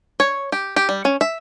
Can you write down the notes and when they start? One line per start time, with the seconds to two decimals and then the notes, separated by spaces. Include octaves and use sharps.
0.20 C#5
0.52 G4
0.76 G4
0.89 G3
1.05 C#4
1.21 E5